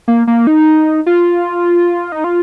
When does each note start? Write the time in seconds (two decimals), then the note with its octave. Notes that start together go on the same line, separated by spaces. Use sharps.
0.08 A#3
0.27 A#3
0.47 D#4
1.06 F4
2.12 D#4
2.24 F4